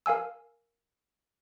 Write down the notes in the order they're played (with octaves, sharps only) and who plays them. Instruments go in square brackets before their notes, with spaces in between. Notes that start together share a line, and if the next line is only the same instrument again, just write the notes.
[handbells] A#4 F5 G#5 E6